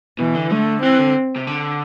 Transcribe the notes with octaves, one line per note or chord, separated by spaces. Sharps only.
B2 E3
D3
D3 A3
E3 C4
D3
C3
D3